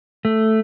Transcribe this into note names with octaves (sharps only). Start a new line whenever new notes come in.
A3